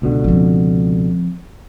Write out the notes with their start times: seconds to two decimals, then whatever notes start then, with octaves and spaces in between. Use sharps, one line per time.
0.02 C#2 B2 D3
0.24 F3 C4